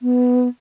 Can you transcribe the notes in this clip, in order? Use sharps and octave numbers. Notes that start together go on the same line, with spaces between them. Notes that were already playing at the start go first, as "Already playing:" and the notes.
B3